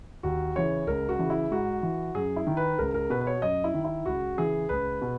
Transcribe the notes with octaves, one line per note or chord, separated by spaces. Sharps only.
D#2 F#4
C#3 E3 C#5
C#2 A#4
F#4
C#3 E3
E4
G#2 F#4
E3
F#2 G#4
E4
D#3
B4
C#2 A#4
A#4
B2 B4
B4
C#5
F#2 D#5
E4
D#3
E4
C#2 F#4
C#3 E3 G#4
C#2 B4
B2